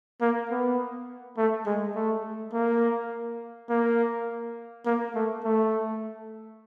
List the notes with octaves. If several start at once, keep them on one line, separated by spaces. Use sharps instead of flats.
A#3
B3
A3
G#3
A3
A#3
A#3
A#3
A3
A3